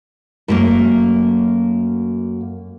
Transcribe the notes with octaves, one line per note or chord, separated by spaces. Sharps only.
F#2 A3 A#3